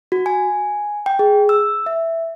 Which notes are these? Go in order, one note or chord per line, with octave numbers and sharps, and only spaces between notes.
F#4
G#5
G5
G#4
E6
E5